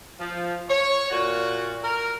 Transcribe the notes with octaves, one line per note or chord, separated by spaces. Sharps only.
F3
C#5
A#2 F#4
A#4